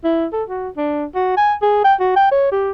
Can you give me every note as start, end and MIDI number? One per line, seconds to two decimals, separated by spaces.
0.04 0.26 64
0.33 0.43 69
0.49 0.69 66
0.77 1.05 62
1.15 1.32 66
1.37 1.54 80
1.62 1.80 68
1.84 1.94 79
2.00 2.12 66
2.17 2.30 79
2.32 2.51 73
2.52 2.72 67